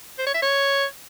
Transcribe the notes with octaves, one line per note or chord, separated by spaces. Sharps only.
C5
C#5
E5
C#5